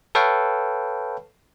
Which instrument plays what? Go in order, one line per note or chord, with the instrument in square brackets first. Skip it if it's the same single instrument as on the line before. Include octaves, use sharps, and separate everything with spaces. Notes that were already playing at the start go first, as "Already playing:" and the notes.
[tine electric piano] A4 B4 C#5 F5 G5